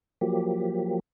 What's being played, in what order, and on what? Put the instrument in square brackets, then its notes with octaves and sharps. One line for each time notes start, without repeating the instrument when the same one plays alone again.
[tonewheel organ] F3 F#3 A#3 G4